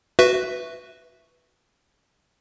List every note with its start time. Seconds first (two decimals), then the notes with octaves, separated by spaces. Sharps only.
0.19 F#4 B4 E5